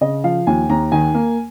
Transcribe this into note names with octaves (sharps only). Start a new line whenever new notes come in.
C#3 D#5
F3 F5
D#2 G#5
D#2 A#5
D#3 G#5
A#3